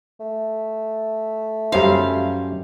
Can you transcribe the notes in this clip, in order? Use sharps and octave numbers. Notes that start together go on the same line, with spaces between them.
A3
F#2 G3 C#4 D#4 C5 F5